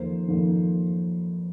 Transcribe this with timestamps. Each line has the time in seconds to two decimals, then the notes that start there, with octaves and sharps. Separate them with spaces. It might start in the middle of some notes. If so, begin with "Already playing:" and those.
Already playing: F2 D#3 A#3 C5
0.28 F2 D#3 A#3